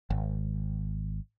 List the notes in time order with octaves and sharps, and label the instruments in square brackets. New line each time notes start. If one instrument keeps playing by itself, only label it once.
[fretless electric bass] G#1